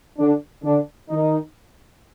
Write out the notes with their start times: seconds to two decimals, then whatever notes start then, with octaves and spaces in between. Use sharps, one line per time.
0.18 D3 D4
0.63 D3 D4
1.09 D#3 D#4